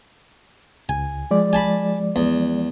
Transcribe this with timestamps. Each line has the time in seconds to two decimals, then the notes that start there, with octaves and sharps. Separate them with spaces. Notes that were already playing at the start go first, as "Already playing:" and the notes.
0.89 C#2 G#5
1.31 F3 G#3 D5
1.53 G#5 A5 B5
2.16 E2